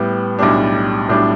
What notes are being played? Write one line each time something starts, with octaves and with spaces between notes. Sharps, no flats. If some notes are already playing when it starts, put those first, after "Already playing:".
Already playing: A2 G3 B3
B1 A2 G3 D4
B1 A2 G3 D4